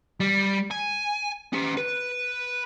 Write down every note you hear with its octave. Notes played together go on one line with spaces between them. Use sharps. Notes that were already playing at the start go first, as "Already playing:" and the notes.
G3
G#5
C#4 G4
B4